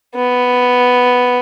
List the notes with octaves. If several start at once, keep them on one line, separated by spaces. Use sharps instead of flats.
B3